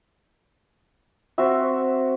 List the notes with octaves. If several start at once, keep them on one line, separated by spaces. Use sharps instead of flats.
C4 F#4 E5